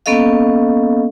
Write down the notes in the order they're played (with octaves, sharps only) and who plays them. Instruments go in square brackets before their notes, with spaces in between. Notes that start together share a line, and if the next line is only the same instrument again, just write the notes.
[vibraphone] A#3 B3 C#4 A4 D#5 F5